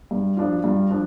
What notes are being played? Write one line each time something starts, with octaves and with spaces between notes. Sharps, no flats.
G2
F3 D4 F4
G2
F3 D4